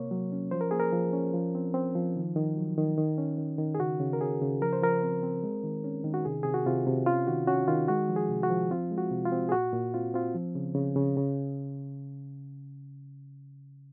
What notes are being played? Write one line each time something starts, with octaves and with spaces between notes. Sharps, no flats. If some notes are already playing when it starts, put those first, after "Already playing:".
Already playing: C3 A#3 C#5
F#3
C#4
F3 C5
A#4
A#3 G#4
A#4
F3
C#4
F3
C4
C4
F3
D#3
D#3
F#3
D#3
D#3
C#4
D#3
D#3
G#4
C#3 F#4
C#3
A#4
C#4 G#4
C#3
F3 A#4
C5
F3 A#4
C4
C4
G#3
D#3
C#4
D#3
F#4
C3 G#4
C3 G#4
F#4
C3 F4
C3
C#4 F4
D#3 F#4
C#4 F#4
D#3 F4
G#3 F#4
F3
G#4
C3
F#4
F3
C4 F4
G#3
F#4
C3
F4
C4
G#4
A#2 F#4
A#2
C4 F4
C4 F4
F3
C#3
C#3
C#3
C#3